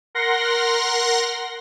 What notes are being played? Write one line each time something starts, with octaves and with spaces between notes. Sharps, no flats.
A#4 F#5 C6 A#6